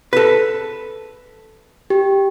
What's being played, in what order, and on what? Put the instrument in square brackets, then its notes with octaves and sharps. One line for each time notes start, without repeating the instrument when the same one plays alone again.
[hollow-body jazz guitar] A4 B4
[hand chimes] G4